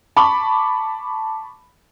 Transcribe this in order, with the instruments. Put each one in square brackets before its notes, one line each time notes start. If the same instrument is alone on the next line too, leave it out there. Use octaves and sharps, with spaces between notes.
[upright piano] A5 B5 C#6 D6